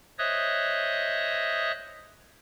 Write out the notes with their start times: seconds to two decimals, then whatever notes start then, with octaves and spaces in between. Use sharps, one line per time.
0.18 C5 C#5 D#5 E5 D#6 F#6